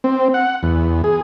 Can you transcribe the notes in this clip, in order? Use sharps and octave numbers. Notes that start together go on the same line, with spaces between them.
C4
F#5
E2
G#4